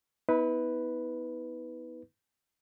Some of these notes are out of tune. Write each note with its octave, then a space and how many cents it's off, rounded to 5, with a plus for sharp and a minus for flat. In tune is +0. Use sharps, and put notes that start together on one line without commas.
B3 +0 E4 -45 B4 +0